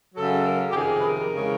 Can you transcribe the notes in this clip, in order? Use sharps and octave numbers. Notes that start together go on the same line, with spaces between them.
F#2 C#3 F#3 A4
A#4
G4
F2 C3 D#3 G#4
B4
A#4
C#3 E3 G#3